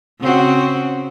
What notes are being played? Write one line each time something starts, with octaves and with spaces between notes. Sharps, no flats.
C#3 C4 F#4